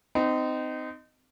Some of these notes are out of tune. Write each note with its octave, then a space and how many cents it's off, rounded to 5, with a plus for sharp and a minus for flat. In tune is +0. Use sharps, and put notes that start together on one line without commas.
C4 -30 D#4 -5